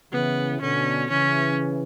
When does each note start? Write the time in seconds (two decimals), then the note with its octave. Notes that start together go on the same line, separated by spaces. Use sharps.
0.12 C#3 E3 B3
0.61 B2 D3 C#4
1.10 C#3 E3 C#4